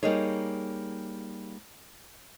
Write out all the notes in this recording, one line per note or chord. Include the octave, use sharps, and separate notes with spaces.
G3 A#3 D#4 G#4 C#5